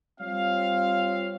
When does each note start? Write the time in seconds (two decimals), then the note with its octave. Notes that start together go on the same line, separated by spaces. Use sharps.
0.20 G3 C4 F4 C#5 F5